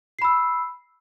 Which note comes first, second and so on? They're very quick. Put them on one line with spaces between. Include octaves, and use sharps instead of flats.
C7 B5 E6